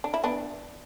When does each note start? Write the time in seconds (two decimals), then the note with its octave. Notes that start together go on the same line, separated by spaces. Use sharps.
0.04 D4
0.14 E4
0.24 B3 D4